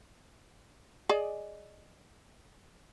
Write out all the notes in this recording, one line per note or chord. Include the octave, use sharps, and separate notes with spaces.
G#4 D5 D#5